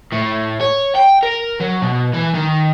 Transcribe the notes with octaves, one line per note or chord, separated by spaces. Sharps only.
A2
C#5
G5
A#4
F#3
B2
E3
D#3